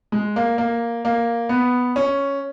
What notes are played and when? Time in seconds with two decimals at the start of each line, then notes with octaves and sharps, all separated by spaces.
0.12 G#3
0.36 A#3
0.58 A#3
1.05 A#3
1.49 B3
1.96 C#4